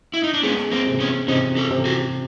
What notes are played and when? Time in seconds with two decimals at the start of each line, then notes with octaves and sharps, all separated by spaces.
0.14 E4
0.24 D#4
0.34 D4
0.43 G#3 B3 C#4
0.72 A#3 C4
0.87 C3
1.00 B3 C#4
1.28 C3 C#4 D#4
1.57 G4 A4
1.71 C3
1.85 F#4 G#4